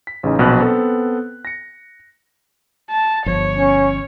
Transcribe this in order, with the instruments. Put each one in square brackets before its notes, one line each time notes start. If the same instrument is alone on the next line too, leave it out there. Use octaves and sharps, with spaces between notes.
[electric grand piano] B6
A1 C#3 D#4
A#1 B2 F#3 B5 F#6
B3 C4 A4
A#6 C#7
[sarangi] A5
[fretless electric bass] G1 F3 [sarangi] C#5
[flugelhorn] C#4